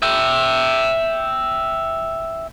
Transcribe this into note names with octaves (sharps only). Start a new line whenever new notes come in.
E5 G5